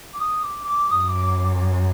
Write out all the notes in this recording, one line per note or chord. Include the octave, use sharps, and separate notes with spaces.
D6
D#6
D6
D6
F#2 D#6
D6
D6
D6